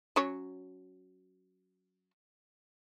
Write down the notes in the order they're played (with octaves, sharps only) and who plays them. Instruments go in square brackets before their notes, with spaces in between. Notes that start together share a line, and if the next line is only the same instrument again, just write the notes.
[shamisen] F#3 C#4 C#5